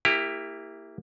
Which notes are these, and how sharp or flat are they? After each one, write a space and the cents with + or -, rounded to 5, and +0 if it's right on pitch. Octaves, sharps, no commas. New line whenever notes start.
A#3 -15 E4 +0 G4 +25